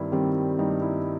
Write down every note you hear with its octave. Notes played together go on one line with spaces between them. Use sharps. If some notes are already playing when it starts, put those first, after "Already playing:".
Already playing: G2 D#3 G3 C4 E4
D#3 G3 C4
G2 D#4
E4